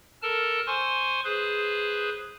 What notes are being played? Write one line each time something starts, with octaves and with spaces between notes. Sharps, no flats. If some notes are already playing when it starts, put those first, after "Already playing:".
A4 A#4 A5 F6
C5 G#5 C6 C#6
G#4 B4 C5